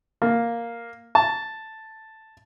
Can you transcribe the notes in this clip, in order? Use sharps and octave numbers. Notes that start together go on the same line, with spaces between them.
A#3
A5